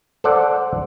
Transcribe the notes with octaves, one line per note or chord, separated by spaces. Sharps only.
A4 C5 D5 F#5